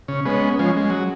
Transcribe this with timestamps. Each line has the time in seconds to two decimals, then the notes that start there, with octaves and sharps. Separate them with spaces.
0.08 C#3
0.25 G#3 B3 C#4
0.59 F3 G#3 C#4
0.77 G#3
0.90 F#3